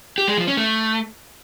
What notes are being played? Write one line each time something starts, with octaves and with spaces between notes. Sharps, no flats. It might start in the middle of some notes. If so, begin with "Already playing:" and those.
G4
G#3
F3
C#4
A3